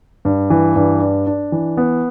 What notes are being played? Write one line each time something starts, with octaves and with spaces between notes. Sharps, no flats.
G2
E3
G2
D4
D4
E3
B3